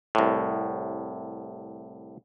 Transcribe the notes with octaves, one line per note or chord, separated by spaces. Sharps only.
C2 A2